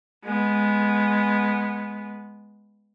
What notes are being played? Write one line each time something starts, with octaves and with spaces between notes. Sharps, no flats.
G#3 B3